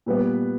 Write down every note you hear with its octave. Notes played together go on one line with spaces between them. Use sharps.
A#2 G3 B3 B4